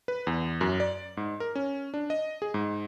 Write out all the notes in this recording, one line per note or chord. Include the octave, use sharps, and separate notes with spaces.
B4
E2
F#2
D5
G#2
A#4
C#4
D4
D#5
G#4
G#2